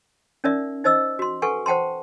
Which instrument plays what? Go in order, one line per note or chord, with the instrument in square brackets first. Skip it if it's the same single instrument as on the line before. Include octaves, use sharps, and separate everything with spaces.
[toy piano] C#4 D#4 A#4 D5 E5
D#4 C5 D#5 E6
F#4 C6
A4 B4 F#5 G#5 C#6
C5 F#5 G5 A5 C6